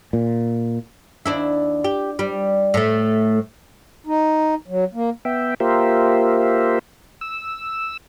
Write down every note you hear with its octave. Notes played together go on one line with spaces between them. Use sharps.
A#2
D#2 D4 E4
G4
G3
A2 A3
D#4
F#3
A#3
B3 E5 G5
A#3 F4 G4 A#4 C5 E5
E6